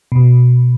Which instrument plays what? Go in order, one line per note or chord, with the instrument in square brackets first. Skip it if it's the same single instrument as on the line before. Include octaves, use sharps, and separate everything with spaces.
[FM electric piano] B2